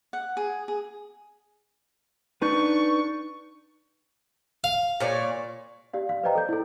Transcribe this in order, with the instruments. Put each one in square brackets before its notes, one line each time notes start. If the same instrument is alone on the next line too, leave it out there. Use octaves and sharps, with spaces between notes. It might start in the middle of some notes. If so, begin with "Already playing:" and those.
[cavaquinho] F#5
G#4
G#4
[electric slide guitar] D4 D#4 B4 [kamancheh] C#6
[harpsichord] F5
[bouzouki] A#2 C#5 D5
[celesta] G4 D5 F5
F5
B4 C5 D5 D#5 G5 A#5
A4 G6
E4 A4